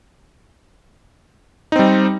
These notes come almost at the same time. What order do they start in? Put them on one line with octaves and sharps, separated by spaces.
D#4 C4 G3